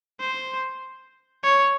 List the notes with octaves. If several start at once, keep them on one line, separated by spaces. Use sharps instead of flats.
C5
C#5